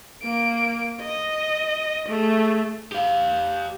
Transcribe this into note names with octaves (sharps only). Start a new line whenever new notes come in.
A#3 D7
D#5
A3 G#4
G4 F5